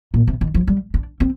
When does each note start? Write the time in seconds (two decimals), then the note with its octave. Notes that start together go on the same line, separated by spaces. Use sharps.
0.14 A#2
0.27 C3
0.41 D#3
0.54 F3
0.67 G3
0.94 D4
1.20 C4